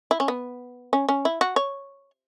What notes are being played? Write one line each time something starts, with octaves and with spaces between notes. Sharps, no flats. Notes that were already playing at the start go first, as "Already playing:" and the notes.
E4
C#4
B3
C#4
C#4
E4
F#4
C#5